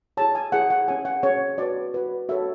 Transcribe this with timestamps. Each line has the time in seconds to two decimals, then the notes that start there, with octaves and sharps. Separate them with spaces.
0.17 E4 G#4 C#5 A5
0.35 G#5
0.52 E4 G#4 C#5 F#5
0.70 F#5
0.88 C#4 G#4 C#5 G#5
1.05 F#5
1.23 C#4 G#4 C#5
1.58 F#4 B4 D5
1.94 F#4 B4
2.29 F#4 A4 C#5 E5